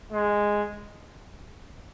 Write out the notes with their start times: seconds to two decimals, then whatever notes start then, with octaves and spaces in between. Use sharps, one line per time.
0.12 G#3